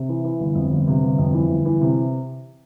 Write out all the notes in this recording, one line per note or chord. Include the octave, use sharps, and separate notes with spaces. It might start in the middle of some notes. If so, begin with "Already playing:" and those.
Already playing: C3
E3
E3
G1
F2
G1
C3
G1
F2
E3
G1
E3
C3